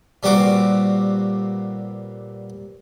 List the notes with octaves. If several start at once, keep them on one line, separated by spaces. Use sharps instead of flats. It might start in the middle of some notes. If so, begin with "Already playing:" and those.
A#2 G3 B3 C4 F#4 D6